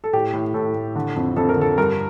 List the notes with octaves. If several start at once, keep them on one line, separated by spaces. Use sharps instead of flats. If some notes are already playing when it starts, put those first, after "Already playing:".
A4
A2 G4
A2
A2 A4
A2
D3
F2
F2 A4
A#4
D3 A4
G2 A#4